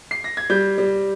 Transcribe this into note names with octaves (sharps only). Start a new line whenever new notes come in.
C7
A#6
G#6
G3 G6
G3